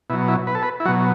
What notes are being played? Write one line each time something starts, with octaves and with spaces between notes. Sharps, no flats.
B2 F#3 E4
E4
B4
A4
B4
E4
B2 F#3 F#4